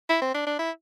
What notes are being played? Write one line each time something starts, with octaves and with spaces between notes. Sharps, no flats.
E4
C4
D4
D4
E4